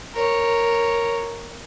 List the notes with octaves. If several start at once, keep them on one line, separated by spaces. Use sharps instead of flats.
A#4 C#5